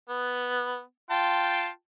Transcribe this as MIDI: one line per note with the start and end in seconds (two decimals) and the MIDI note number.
0.09 0.82 59
1.11 1.68 65
1.11 1.68 79
1.11 1.68 81